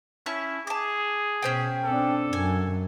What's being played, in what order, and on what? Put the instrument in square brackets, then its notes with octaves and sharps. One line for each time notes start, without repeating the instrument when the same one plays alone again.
[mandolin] C#4 A5 C#6 [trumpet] E4
[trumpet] G#4 [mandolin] A5 D6
[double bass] B2 [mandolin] C#4 C5 G5
[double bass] C4 D4 [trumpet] A4
[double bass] F#2 [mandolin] G#5